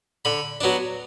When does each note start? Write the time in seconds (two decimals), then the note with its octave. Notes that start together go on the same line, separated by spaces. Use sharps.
0.25 D3 B5
0.61 F#3 B3 D4